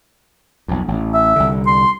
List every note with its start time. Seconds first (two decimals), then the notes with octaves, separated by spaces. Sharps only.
0.68 B1 F2
0.88 A1
1.14 E5
1.36 C2 D3
1.67 C6